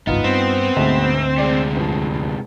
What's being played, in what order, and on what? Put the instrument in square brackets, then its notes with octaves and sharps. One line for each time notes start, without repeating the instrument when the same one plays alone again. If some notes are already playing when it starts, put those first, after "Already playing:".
[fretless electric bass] G#1 C#2 G2 [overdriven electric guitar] B3 [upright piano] D#4 F4
[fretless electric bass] G2 [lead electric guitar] C4
[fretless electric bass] D2 D3 [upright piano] G#2 B2 A3
[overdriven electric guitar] C3 G#3 [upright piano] D5
[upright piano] E1 G2 F3